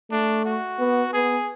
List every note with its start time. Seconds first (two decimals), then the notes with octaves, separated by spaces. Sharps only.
0.11 A3 D4
0.45 F#4
0.79 B3
1.13 B3 G#4